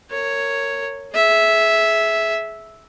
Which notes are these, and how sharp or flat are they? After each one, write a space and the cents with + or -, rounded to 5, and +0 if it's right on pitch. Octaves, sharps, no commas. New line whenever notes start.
A#4 -20 C#5 +0
G#4 +25 E5 -5